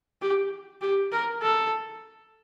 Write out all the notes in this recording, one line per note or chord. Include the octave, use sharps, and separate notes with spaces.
G4
G4
A#4
A4